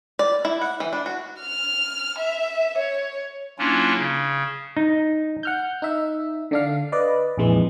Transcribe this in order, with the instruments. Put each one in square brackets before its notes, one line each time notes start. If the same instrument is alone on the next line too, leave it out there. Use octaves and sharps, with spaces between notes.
[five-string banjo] D5
E4
F#5
E3
D4
F#4
[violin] F6
E5
C#5
[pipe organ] F#3 A#3 C#4 D4 E4 F4
C#3
[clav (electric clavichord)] D#4
[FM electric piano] F#5 F6 G6
D#4 E5
D3 D4 F5
B4 D5 D#5
A#1 F2 E3 G#3